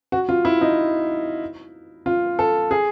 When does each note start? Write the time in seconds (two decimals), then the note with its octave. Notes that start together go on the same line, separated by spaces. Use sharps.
0.12 F#4
0.29 F4
0.45 E4
0.61 D#4
2.06 F4
2.39 A4
2.71 G#4